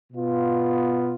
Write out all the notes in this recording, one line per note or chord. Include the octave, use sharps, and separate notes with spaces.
B2 B3 F4